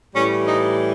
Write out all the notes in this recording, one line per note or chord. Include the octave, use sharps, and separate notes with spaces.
A2 E3 G3 C#4
D#4